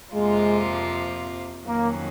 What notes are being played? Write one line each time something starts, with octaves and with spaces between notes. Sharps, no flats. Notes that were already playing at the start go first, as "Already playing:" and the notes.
F2 C3 F3 G#3 A#3 F4
F2 D#3 F#3 A#3 C#4